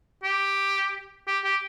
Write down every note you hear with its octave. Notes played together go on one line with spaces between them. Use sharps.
G4
G4
G4